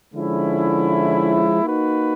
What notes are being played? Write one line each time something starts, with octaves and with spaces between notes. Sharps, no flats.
D3 F3 G#3 C#4 E4
A#3 D#4 F#4 B4